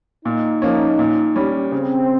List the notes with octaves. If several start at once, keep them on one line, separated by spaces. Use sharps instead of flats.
A#2 D#4
F3 A#3 C#4
A#2
G3 C#4
C#3 C4